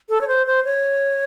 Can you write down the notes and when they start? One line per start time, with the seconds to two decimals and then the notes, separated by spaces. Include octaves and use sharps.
0.09 A4
0.21 C#5
0.28 C5
0.47 C5
0.65 C#5